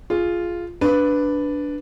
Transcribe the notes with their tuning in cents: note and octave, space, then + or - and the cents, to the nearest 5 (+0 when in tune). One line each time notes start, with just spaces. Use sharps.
F4 -5 G#4 +0
D4 -5 B4 +0